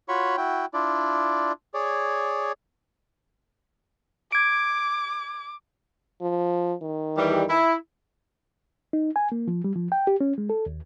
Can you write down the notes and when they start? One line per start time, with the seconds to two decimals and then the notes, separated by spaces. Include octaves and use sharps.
0.09 F4 F#4 C#5 B5 C#6
0.37 E4 F#4 G5
0.74 D4 E4 F4 D5
1.74 G#4 C#5 D5
4.32 D6 G#6 D7
6.21 F3
6.82 D#3
7.17 E2 E3 G3
7.49 E4
8.93 D#4
9.16 G#5
9.32 A#3
9.48 F3
9.64 G3
9.76 F3
9.92 G5
10.07 G4
10.21 C#4
10.38 G#3
10.50 A4
10.66 D#2